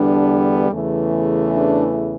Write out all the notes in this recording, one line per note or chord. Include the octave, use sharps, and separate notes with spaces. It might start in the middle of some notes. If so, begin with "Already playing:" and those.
Already playing: E2 D3 G3 B3 D4
E2 C#3 E3 A3
D4